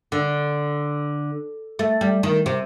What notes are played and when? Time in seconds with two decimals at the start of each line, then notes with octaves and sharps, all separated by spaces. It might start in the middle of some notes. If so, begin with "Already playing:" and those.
0.12 D3
1.79 A3
2.01 G3
2.23 D#3
2.46 C3